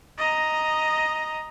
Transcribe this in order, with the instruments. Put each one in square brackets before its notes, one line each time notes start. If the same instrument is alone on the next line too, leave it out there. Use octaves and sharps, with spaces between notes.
[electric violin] D#5 A#5